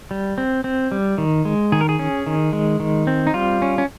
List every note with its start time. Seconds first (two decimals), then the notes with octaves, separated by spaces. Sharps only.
0.11 G3
0.38 C4
0.64 C4
0.92 G3
1.18 D#3
1.45 G#3
1.72 D#3 G#4
1.81 A#4
1.89 G#4
1.99 C#4
2.27 D#3
2.53 G#3
2.80 D#3
3.07 C4
3.27 D#4
3.34 G3 F4
3.62 C#4
3.78 C#4